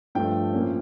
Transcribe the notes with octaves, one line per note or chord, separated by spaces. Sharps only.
G2 F3 A3 D4 G5
A2 F3 A#3 C#4